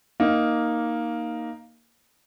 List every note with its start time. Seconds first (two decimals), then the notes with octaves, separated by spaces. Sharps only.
0.20 A#3 D#4